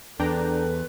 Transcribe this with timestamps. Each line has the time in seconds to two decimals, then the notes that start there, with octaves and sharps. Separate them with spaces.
0.20 E2 D4 A4 B4 G5 A#5